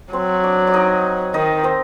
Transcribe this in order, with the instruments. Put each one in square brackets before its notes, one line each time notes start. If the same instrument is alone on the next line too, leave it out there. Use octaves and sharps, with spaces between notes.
[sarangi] F#3 [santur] C4 C5
[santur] D4 D5
D5
D#4 D#5
[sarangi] D#3 [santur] D#4 D#5
[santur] C4 C5